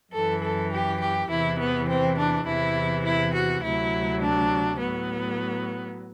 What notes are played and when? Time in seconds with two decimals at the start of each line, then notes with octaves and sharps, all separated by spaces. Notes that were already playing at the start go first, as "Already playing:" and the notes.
0.13 F#2 E3 A4
0.42 A4
0.72 G4
1.01 G4
1.30 E2 C3 E3 E4
1.59 B3
1.89 C4
2.18 D4
2.46 E2 C3 E3 E4
3.05 E4
3.35 F#4
3.64 D2 C3 F#3 E4
4.22 D4
4.80 A2 F#3 B3